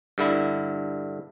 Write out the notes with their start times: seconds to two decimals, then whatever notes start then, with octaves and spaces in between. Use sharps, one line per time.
0.18 G2 D3 E4